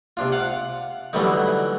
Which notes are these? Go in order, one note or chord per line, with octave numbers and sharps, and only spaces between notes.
C3 D4 F4
F5 F#5
D3 E3 F#3 G3 A3 D#4